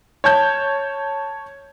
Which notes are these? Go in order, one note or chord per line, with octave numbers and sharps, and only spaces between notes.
C#5 A5 G6